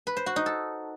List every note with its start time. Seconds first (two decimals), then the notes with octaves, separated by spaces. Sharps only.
0.07 B4
0.17 C5
0.26 F#4
0.36 D#4
0.46 A4